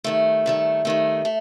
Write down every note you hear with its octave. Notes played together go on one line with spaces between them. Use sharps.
G2 D#3 A3
G2 D#3 A3
G2 D#3 A3
A3